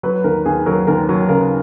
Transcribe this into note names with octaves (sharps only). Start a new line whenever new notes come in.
F#3 B4
D#2 A#4
D#2 G#4
F#3 A#4
D#2 A#4
F#3
C#3 A#4